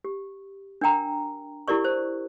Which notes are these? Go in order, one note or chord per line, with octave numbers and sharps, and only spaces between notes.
G4
D4 A#4 G5 A#5
E4 G4 A#4 D5 C#6
C5